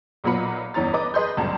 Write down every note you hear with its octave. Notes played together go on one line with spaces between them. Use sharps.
B1 A#2 F#3 B3 B5 C#7
G1 E2 E3 C#4 A#5 A6
B4 D#5 D6 D#6
G#4 B4 D#5 C6 G6
G1 C#2 F#2 A5 A#5